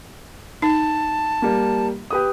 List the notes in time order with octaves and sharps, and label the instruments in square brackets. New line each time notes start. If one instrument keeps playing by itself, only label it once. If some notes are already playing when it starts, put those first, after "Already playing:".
[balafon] D#4 [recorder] A5
[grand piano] G3 A#3
G4 B4 D#6